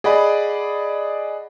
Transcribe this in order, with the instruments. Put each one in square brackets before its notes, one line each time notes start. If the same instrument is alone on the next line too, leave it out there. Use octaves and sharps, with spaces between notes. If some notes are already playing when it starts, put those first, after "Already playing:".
[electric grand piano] G#4 D5 D#5 F#5 B5